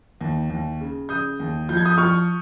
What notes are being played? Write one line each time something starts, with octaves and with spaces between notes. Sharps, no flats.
D#2
D#2
C#3
C#3 D#6 G6
D#2
F3 G6
G#6
D#6 G6
F3 C#6 F6